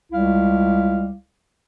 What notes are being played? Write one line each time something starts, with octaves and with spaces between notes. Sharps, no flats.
C#2 G3 E4 F5